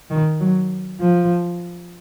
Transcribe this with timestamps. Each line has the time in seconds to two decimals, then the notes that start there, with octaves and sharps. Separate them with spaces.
0.10 D#3
0.40 F#3
1.01 F3